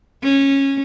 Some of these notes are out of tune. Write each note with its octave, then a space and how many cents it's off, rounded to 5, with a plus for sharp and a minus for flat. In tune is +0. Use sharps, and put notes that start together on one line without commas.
C#4 -15